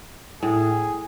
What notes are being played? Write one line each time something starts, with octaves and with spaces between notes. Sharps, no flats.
A2 G#4